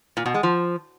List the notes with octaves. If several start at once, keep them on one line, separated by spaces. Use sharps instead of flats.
A#2
B2
G#3
F3